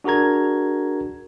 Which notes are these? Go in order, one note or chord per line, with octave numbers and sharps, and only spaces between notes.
D4 F#4 G#4 A#4 A#5 G#6